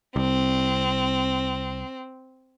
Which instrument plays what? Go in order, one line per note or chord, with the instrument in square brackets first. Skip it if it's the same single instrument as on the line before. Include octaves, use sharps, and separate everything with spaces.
[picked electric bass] C2 [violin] C4